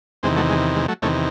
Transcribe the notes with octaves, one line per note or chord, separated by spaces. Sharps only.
E2 C3 D#3 G#3 C4
F#3 A3
G#3
G#3
F#3 A3
E2 C3 D#3 A3 C#4